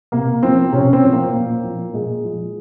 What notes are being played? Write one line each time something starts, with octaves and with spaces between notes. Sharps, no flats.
C3 A#3
F3 C4
C3 C#4
C4
F3
A#3
A#2
F3
A#2 G#3
F3